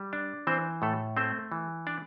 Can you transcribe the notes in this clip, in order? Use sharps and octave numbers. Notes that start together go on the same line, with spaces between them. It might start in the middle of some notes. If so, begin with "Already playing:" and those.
Already playing: G3
D4
E3 C4 C5
A2 A3 A4
A3 C4 C5
E3
D4 D5